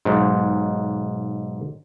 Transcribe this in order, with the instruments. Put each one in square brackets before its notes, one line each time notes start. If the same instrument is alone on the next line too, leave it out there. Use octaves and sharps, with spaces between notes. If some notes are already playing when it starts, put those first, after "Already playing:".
[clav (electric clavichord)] B1 G#2